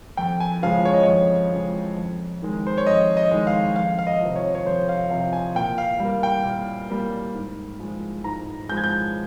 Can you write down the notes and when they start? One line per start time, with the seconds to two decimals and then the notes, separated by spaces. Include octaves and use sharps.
0.17 F2 G5
0.40 G#5
0.63 C#3 F3 G#3 F5
0.85 C#5
0.93 D#5
1.03 F2 C#5
1.52 C#3 F3 G#3
1.97 F2
2.42 D#3 G#3
2.67 C5
2.78 C#5
2.87 F2 D#5
3.17 D#5
3.31 D#3 G#3
3.47 F5
3.76 F2 F5
3.99 F5
4.07 D#5
4.20 C3 F3
4.36 C#5
4.55 C#5
4.66 F2 C5
4.89 F5
5.10 C3 F3 F5
5.33 G#5
5.55 A#2 G5
5.78 F5
6.00 G3 A#3
6.23 G5
6.44 A#2
6.90 G3 A#3
7.34 G#2
7.79 F3 G#3
8.24 G#2 A#5
8.69 F3 G#3 G6
8.77 G#6
8.84 G6